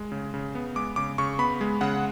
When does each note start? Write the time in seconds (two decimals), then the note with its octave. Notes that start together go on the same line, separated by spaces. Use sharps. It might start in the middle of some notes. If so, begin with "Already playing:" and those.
Already playing: G#3
0.12 C#3
0.34 C#3
0.55 B3
0.76 G#3 D6
0.96 C#3 D6
1.18 C#3 C#6
1.39 B3 B5
1.61 G#3
1.81 C#3 F#5